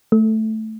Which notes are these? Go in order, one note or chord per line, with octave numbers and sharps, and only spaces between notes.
A3